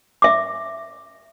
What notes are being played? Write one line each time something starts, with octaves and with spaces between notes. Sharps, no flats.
E5 D6